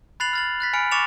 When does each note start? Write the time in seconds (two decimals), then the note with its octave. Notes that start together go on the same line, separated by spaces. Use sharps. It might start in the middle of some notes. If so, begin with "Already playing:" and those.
0.20 B5 F#6 A6 C7 F7 F#7
0.33 F6 A6 F#7
0.60 F#6 A6 B6
0.73 G#5 B5 F6 C#7 D7
0.91 C#6 D6 A6 C#7 E7 F7